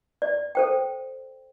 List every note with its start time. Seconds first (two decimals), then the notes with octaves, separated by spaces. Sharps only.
0.22 D5
0.55 A4 C5 G5